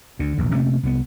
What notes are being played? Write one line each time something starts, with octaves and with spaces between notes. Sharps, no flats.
D2 D3
E1 A#1 E2
C3 A3 A#3 C#4
C2 E3 B3